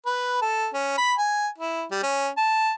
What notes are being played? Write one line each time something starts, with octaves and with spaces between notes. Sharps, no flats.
B4
A4
C#4
B5
G#5
E4
G3
C#4
A5